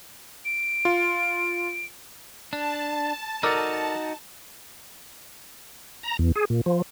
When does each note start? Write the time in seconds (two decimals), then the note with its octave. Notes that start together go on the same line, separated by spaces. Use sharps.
0.45 D7
0.85 F4
2.53 D4 A5
3.43 D#4 F#4 A4 A#4 D5
6.03 A#5
6.19 E2
6.35 G#4
6.50 A#2
6.66 F3